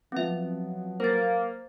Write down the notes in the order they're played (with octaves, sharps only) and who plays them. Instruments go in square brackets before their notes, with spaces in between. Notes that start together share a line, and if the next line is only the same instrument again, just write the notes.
[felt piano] F3 B3 [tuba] F#3 [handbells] C4 E5
[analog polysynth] A#3 [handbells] C5 A6